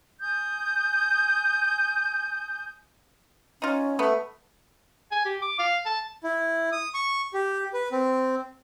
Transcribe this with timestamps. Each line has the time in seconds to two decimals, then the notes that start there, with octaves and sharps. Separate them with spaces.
0.21 G#5 D#6 G6
3.62 C#4 D#4 F4
3.99 A3 B3
5.12 G#5
5.25 G4
5.42 D6
5.59 F5
5.86 A5
6.24 E4
6.72 D#6
6.94 C#6
7.34 G4
7.74 B4
7.92 C4